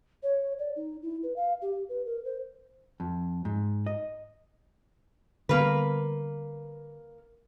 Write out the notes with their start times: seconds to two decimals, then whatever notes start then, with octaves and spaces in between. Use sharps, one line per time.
0.23 C#5
0.59 D5
0.76 D#4
1.03 E4
1.23 B4
1.36 F5
1.62 G4
1.89 B4
2.06 A#4
2.25 C5
3.00 F2
3.45 G#2
3.86 D#5
5.49 D3 G3 A#3 B3 B4